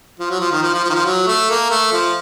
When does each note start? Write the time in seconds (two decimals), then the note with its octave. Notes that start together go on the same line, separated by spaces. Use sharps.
0.20 F3
0.30 F#3
0.40 F3
0.52 D#3
0.62 F3
0.74 F3
0.84 F3
0.90 D#3
0.95 F3
1.05 F#3
1.27 A3
1.50 A#3
1.71 A3
1.93 F3